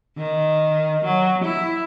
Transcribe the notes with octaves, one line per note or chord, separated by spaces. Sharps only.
D#3
F#3
E4